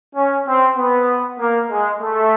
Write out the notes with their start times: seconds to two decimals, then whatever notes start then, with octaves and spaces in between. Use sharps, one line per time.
0.15 C#4
0.46 C4
0.76 B3
1.39 A#3
1.70 G#3
2.00 A3